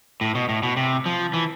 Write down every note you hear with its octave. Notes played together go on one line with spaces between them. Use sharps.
A2
B2
A2
B2
C3
F3
E3